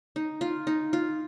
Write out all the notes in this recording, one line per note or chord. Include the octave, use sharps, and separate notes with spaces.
D#4
F4
D#4
F4